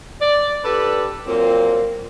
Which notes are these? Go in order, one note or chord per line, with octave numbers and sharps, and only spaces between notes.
D5
D4 G4 A4 B4
A#2 F#3 A#3 C4